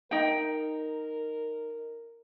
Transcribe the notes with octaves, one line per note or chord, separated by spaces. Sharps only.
D#4 A#4 G5